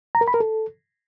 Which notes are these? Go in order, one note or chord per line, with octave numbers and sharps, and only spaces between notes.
A#5
A#4
B5
A#4
A4